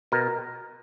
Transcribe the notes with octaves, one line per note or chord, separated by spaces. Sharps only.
B2 A#4